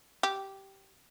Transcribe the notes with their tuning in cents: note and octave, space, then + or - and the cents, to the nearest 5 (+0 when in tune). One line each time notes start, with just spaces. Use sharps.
G4 -10